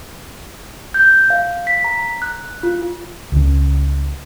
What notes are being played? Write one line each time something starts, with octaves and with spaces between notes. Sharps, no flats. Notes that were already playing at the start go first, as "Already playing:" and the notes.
G6
F5
B6
A#5
F#6
F4
C#2 C#4